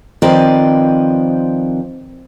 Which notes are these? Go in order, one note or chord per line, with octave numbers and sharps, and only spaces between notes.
D#3 F3 C4 B4 D5 D#5